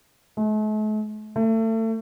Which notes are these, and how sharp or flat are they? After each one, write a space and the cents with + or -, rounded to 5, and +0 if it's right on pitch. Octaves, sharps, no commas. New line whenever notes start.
A3 -45
A3 +30